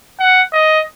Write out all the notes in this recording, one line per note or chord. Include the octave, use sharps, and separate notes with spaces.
F#5
D#5